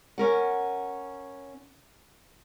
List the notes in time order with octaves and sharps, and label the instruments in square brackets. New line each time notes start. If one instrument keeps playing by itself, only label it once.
[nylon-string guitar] C#4 A#4 F#5